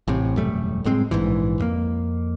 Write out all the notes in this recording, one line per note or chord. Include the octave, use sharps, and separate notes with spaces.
A1 A2 C3
E1 F#2 G3 A3
F#1 A2 G#3 C4
A#1 G#2 E3
F2 A#3